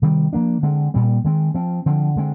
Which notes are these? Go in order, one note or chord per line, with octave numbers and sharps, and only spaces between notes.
C3 D#3 G3 C4
F3 A#3 D4
D3 G#3 C4
A#2 G3 C4
D#3 G#3 C4
F3 C4
D3 F3 C4
D3 G#3 C4